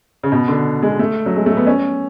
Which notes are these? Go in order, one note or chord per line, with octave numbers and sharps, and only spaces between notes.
C#3
B2
D3
G#3
A3
F#3
G#3
A3
B3
C#4